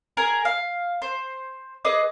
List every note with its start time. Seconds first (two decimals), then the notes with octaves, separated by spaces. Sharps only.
0.17 G#4 A#4 G#5
0.45 F5
1.02 C5
1.85 G#4 B4 D#5 D6